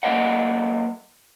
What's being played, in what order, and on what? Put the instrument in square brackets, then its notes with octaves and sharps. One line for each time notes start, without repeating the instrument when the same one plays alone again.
[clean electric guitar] F#3 A#3 B4 D5 D#5 F#5